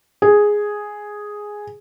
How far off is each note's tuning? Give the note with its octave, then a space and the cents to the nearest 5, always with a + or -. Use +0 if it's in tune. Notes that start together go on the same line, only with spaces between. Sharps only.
G#4 +0